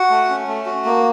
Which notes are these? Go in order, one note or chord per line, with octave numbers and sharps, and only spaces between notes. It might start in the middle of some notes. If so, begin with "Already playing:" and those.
Already playing: F#4 F#5
A3
C#4
A3
F#4
A#3